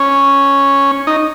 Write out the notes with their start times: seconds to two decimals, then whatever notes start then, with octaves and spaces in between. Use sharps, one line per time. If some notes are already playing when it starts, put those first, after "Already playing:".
Already playing: C#4
1.07 D#4